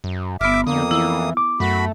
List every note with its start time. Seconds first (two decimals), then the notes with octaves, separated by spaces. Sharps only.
0.04 F#2
0.41 G1 B3 E5 D6 F6
0.67 F2 D3 A#3 D#6
0.91 E3 E4
1.37 D6
1.60 F#2 A3 F#4 B5